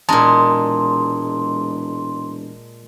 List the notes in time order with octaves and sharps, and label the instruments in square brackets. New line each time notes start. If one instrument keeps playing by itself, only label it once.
[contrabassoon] E1 [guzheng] A#2 G#3 [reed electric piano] A5 A#5 [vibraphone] C6